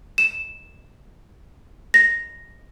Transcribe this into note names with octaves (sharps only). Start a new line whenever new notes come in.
E7
A#6